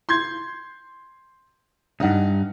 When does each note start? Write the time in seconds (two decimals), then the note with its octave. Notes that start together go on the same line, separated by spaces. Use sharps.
0.09 C6 G6 G#6
2.00 D2 G2 D#4 F#5